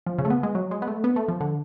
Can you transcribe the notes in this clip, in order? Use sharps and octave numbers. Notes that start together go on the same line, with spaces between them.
F3
C#3
A3
B3
G#3
F#3
G#3
B3
A3
B3
A3
F3
D3